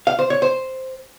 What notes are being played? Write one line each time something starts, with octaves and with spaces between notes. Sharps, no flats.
F5
C5
C#5
C5